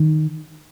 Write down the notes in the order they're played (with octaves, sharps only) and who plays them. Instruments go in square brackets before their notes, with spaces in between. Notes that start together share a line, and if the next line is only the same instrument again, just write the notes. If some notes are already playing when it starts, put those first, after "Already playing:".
Already playing: [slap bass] D#3